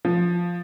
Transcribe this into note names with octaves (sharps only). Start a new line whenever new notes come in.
F3